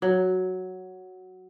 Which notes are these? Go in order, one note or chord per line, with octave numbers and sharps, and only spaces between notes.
F#3